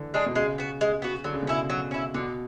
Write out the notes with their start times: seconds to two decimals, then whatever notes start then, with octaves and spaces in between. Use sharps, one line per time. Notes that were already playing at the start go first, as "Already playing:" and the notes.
Already playing: D3 E3
0.14 G#3 D4 G#4
0.26 B2
0.35 C#3 G#3
0.58 B3 F#4
0.81 G#3
1.02 B3 F#4
1.24 D3 F#3
1.33 C#3
1.43 B2
1.47 C#3 C#4 E4
1.70 F#3
1.91 C#4 E4
2.14 B2 D3